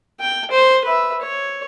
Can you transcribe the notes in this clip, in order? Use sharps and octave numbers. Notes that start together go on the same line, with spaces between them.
G5
C5
B4 E5
C#5